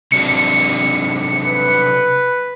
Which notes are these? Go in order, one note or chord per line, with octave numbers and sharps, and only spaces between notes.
C3 F#3 D4 C#7
B4